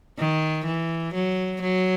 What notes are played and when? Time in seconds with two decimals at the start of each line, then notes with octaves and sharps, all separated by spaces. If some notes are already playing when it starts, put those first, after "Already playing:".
0.18 D#3
0.65 E3
1.14 F#3
1.62 F#3